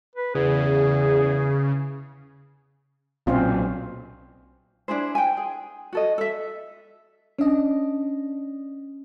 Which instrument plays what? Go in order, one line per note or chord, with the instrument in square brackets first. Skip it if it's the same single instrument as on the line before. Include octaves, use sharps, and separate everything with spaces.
[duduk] B4
[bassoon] E2 [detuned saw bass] C#3 [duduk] G#4
[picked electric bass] B1 A#2 [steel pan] C4 C#4 F4
[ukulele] D4 E4 G#4 C5
G5 G#5
G#4
F#4 A4 D#5
A4 E5
[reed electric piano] C#4 [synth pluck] D4 D#5